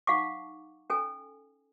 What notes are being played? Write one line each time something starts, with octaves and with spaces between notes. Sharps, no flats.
D#4 F5 F#5 A5 C#6 D6
C#4 A4 G#5